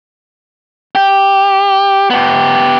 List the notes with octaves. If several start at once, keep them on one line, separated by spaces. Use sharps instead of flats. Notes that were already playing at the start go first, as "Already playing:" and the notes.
G4
B3 G4